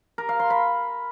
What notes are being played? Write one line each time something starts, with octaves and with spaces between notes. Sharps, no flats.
A#4
F5
C6
B5